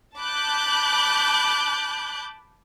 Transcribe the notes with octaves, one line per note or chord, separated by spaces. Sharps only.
A5 B5 D6 F#6 G6